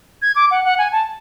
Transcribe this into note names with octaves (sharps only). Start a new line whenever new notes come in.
G#6
D6
F#5
F#5
G#5
A5